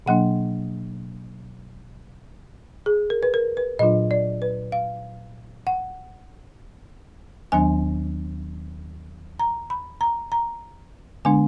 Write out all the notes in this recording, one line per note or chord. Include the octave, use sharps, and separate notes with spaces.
B2 F#3 A#3 D4 F#5
G#4
A#4
B4
A#4
B4
A#2 F#3 D4 F4 D#5
D5
B4
F5
F#5
D#2 D#3 F#3 B3 D4 G#5
A#5
B5
A#5
A#5
D3 G#3 B3 D4 G#5